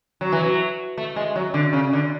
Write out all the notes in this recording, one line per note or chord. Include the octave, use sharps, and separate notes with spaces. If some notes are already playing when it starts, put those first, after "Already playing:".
F#3
E3
F#3
A3
G#3
F#3
D3
C#3
D3